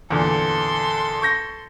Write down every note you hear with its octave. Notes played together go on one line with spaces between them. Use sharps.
E2 A#2 D3 A4 C6
C#6 G6 A#6